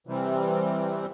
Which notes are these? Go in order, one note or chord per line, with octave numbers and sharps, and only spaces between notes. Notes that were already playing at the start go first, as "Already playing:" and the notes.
C3 E3 G3 C4